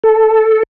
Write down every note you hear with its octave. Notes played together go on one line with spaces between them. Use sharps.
A4